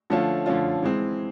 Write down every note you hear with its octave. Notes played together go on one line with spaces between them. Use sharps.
D3 F3 A3 C#4 F4
D3 F3 A3 C#4 F4
E3 G#3 C4